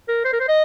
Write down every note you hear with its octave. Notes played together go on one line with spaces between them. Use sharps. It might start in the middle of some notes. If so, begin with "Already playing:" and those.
A#4
C5
A#4
C5
D#5